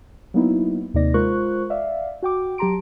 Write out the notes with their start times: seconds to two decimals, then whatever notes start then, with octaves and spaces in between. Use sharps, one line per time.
0.34 F#3 A#3 B3 D#4 E4
0.94 D#2 C3 A#3 D#4 D5 A#6
1.14 G#3 F4 A#4 C5 C#6 F#6
1.70 D5 E5 F5
2.22 F#4 G5 D6
2.58 F#3 G4 A5 A#5 C6 D7